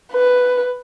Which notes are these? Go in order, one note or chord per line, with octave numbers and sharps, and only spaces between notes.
B4